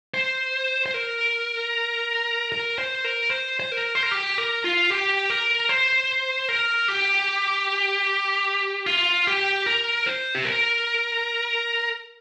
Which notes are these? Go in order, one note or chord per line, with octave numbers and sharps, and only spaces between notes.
C5
C5
A#4
A#4
C5
A#4
C5
C5
A#4
C5
A#4
G4
A#4
F4
G4
A#4
C5
A#4
G4
F4
G4
A#4
C5
G4
A#4